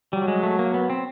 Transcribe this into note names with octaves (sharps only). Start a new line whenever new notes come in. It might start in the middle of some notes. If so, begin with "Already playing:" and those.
F#3 G3
G#3
A3
A#3
B3
C4